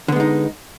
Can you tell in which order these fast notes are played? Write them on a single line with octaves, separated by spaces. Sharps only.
D3 B3 G#3 D#4